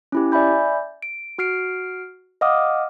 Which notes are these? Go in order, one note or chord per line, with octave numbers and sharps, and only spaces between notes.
C#4 E4 G4
D5 E5 G#5 B5 G6
D7
F#4 F6 C7 D7
D#5 F5 F#5 D6 D#6 F6